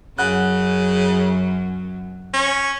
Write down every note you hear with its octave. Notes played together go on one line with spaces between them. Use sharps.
F#2 C#3 F#3 F#5 F#6
C#4